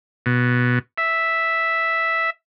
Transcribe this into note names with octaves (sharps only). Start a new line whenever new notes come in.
B2
E5